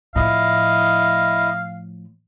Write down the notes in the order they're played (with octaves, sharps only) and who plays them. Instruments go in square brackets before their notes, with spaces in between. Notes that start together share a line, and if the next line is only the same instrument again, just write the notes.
[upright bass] A2 F3 [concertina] E4 D#5 [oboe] F5